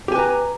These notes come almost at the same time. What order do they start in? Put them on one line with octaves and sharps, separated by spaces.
G4 G#5 B4 A#5